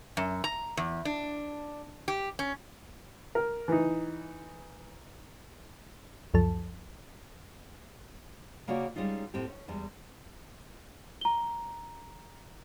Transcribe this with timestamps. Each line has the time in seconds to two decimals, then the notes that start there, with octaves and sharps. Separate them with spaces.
0.17 F#2
0.44 A#5
0.77 E2
1.05 D4
2.08 G4
2.39 C#4
3.35 A#4
3.68 E3 D#4
6.34 C#2 F#2 F3 A4 A5
8.67 C#3 A#3 F4 F#4 C#5 D5
8.96 G3 G#3 C#4 D#4 F4
9.34 A2 C4 G4
9.48 C#4
9.68 E2 G3 G#3
11.21 A#5 G7